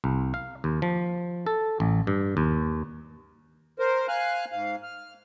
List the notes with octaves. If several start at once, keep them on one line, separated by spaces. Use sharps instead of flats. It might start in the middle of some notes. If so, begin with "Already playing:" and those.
C2
F5
D#2
F3
A4
A1
G2
D#2
A#4 C5
F5 G#5 F6 F#6
G#2 F5
F6